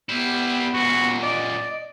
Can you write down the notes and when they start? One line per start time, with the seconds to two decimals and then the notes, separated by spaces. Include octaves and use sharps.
0.09 G3 B3 E4
0.74 F#2 A#2 F#4
1.23 D5 D#5